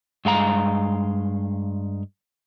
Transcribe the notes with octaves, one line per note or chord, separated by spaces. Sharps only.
G2 G#3 F5 A#5